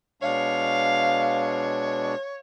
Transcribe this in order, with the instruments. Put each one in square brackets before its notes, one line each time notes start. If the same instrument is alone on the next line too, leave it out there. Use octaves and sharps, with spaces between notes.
[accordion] B2 G#3 D4 [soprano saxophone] C#5 [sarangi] F5